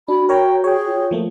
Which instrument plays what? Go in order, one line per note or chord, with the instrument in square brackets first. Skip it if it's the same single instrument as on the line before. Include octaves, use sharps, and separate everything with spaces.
[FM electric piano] D4 [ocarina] F#4 [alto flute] B5
[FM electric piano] A#4 C#5 A#5 [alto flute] G5
[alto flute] G#4 [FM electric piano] C#5 G5
[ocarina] F4
[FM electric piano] F3 A3 A#3